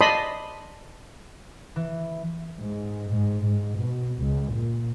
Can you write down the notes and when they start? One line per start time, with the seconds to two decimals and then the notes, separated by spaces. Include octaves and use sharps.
0.01 D5 D#5 A5 B5 C6 D#6
1.76 E3
2.59 G#2
3.10 G#2
3.45 G#2
3.78 B2
4.20 C#2
4.53 A#2